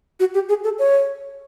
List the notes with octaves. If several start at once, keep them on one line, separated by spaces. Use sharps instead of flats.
F#4
G4
G#4
A4
C#5